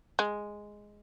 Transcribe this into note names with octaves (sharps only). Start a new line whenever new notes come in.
G#3